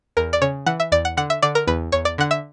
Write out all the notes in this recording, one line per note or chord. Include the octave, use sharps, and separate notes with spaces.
E2 A#4
D5
C#3 C#5
E3 F#5
E5
E2 D5
F#5
D3 F#5
E5
D3 D5
A#4
E2 B4
E2 C#5
D5
D3 F#5
E5